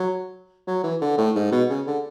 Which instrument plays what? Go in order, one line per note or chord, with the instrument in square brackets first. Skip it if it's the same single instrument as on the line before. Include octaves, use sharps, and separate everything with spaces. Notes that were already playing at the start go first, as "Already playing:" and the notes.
Already playing: [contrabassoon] F#3
F#3
E3
D3
A2
G#2
B2
C#3
D3